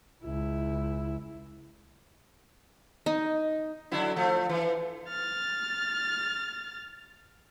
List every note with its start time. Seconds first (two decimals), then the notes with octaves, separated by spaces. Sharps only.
0.25 C#2 E4
3.06 D#4
3.92 D3 F#3 E4
4.16 F3 A3
4.49 E3
5.09 F6 A6